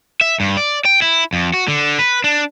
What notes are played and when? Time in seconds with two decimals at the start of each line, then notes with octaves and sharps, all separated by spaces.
0.21 E5
0.40 G2
0.57 D5
0.85 G5
1.02 E4
1.33 F2
1.54 F#4
1.68 D3
1.99 B4
2.24 D4